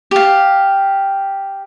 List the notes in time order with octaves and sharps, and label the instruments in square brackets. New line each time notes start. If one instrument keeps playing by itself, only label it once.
[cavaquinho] G4 F5